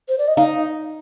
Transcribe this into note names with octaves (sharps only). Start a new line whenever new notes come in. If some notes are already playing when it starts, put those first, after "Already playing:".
C5
D5
D#5
D#4 F5